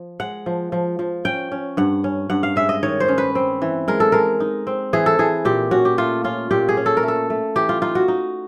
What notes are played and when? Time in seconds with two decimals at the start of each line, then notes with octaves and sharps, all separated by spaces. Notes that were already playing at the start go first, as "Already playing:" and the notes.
Already playing: F3
0.20 G#3 F#5
0.46 F3
0.72 F3
0.99 F3
1.25 C#4 G5
1.52 C#4
1.77 G2 F#5
2.04 C#4
2.30 G2 F#5
2.43 F5
2.56 G#3 E5
2.69 D#5
2.83 D#3 C#5
3.00 C5
3.08 C#4
3.18 B4
3.35 C4
3.62 E3
3.88 G#3 A#4
4.00 A4
4.12 G#3 A#4
4.40 D#4
4.67 C4
4.93 E3 G#4
5.06 A4
5.19 E3 G#4
5.45 A#2 G4
5.71 C#4 F#4
5.85 G4
5.98 A3 F4
6.24 C#4 F4
6.51 A#2 G4
6.69 G#4
6.77 C#4
6.86 A4
6.97 A#4
7.03 A3
7.08 A4
7.30 A3
7.56 E3 G4
7.69 F4
7.82 D#4 F4
7.95 F#4
8.08 D#4